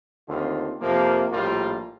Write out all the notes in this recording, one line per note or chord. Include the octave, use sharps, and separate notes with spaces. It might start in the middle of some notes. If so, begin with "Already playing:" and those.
D#2 D3 A3 C4 F4
F2 C3 F3 A#3
A#1 A2 G3 A#3 F4